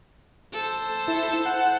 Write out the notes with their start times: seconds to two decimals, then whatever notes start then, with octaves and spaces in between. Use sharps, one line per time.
0.53 A4 C5
1.08 E4
1.46 F#5